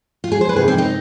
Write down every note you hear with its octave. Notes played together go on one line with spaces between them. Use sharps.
F4
G#4
C5
B4
C3 D#3 G#4
C4
D#4